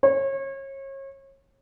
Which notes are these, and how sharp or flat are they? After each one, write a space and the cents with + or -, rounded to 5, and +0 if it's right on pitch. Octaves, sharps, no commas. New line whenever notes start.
C#5 -35